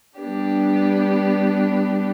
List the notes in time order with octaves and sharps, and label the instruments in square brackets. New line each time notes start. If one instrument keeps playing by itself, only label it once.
[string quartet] G3 B3 D4 G4